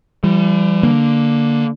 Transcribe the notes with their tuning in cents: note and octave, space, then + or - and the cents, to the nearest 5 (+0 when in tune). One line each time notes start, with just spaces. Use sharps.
E3 +45 G3 +0
D3 +0 A#3 +0